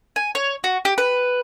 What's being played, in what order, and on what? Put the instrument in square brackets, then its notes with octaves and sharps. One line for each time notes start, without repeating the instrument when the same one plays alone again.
[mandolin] G#5
C#5
F#4
G4
B4